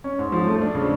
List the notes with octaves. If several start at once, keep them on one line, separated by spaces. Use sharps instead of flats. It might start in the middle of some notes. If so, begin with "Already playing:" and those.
C#4
G#2
F3
A3
D4
C#3